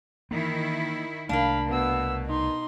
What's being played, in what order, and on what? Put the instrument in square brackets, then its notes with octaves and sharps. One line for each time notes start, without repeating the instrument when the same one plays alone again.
[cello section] D#3 E4 [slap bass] E3 A#3
[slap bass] C2 A3 [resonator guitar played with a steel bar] A#3 D4 [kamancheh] F5 B5
[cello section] B2 [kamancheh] B3 E6
[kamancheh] D#4 C6